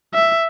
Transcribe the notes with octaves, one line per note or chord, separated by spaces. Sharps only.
E5